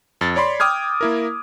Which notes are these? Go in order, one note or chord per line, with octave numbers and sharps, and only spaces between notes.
F2 A6
C#5 D5 B5 C6
G5 D6 D#6 F6 G#6
A#3 E4 A#4